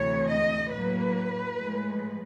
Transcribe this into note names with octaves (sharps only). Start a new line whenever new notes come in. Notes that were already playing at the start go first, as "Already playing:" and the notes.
Already playing: D2 C3 E3 A3 C#5
D#5
A2 F#3 A#3 B4
A2 F3 G#3